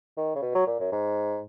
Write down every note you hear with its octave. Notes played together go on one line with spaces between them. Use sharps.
D#3
C#3
B2
F#3
A#2
F#2
G#2